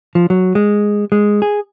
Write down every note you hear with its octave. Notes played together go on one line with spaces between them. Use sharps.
F3
F#3
G#3
G#3
G#4